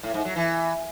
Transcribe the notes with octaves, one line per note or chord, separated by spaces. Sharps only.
A2
G#2
F#3
E3